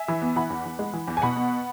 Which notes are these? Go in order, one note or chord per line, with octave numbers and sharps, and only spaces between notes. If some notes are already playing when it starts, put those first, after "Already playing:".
Already playing: E5 G#5
E3
B3
E3 F#5 B5
E2
E2
G#3
E3
E2
G#5
B2 F#5 B5
B3